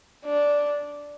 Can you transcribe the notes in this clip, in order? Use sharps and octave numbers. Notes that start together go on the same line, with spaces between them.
D4